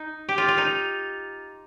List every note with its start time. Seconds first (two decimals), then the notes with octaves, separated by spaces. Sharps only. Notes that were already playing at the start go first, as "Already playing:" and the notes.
Already playing: D#4
0.29 G4
0.38 F4
0.48 F4
0.58 D#4